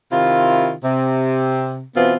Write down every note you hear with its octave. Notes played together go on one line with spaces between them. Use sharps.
C3 D#3 E4 F4
C3
B2 E3 B3 C4 F4